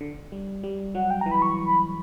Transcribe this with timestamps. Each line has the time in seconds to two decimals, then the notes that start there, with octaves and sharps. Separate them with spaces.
0.01 D3
0.32 G3
0.63 G3
0.95 F#3 F#5
1.11 G5
1.21 E3 A#5
1.31 B5
1.42 C#6
1.65 B5